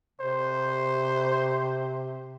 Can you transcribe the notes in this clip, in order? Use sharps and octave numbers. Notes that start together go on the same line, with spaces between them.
C3 C5